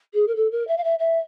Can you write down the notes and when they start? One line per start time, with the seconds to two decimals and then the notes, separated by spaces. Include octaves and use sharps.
0.14 G#4
0.27 A#4
0.35 A4
0.51 A#4
0.67 E5
0.77 F5
0.83 E5
0.99 E5